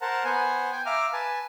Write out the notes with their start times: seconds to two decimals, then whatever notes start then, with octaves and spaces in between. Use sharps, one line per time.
0.01 A#4 C5 F#5 A5 A#5
0.25 B3 C5 F#5 G#5
0.73 G5 G#5 G6
0.86 E5 F5 A#5 D6 F6
1.13 B4 G#5 A5